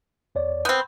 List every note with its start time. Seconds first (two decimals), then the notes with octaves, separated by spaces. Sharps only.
0.35 E2 C#5 D5
0.65 B3 C4 G6